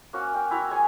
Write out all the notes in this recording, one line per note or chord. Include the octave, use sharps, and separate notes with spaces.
A#3 C#4 F#4
G5
E4 F#4 A#5
G#4 C#5 G#5